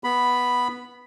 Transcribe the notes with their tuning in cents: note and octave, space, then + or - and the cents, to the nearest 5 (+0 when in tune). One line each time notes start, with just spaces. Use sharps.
B3 -5 B5 +0